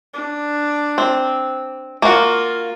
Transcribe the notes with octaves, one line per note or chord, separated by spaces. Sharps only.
D4
C4
A#3 F4 F#4